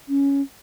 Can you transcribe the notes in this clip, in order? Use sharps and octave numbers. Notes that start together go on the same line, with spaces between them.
C#4